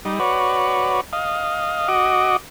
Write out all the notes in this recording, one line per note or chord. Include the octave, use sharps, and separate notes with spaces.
G3 D#4
F#4 B4 C#5 D5
D#5 F5
F#4 D#5 D6